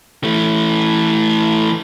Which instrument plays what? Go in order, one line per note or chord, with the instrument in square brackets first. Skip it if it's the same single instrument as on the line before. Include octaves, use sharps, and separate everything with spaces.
[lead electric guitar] E3 A3